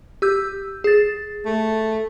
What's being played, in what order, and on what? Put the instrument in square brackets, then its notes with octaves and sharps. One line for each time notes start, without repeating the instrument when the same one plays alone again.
[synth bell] G4 E6 G6
G#4 A6
[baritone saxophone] A3